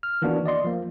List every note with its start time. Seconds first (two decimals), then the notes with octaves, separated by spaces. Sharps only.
0.03 F6
0.22 D#3 E3 A#3 B3 D4 F#4
0.46 D5 D#5 C6
0.64 F3 A#3